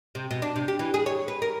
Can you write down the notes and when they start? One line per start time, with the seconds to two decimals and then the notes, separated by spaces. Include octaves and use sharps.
0.15 C3
0.31 B2
0.42 D4
0.56 C3
0.68 G4
0.79 E3
0.94 G#4
1.06 C#5
1.28 B4
1.42 A#4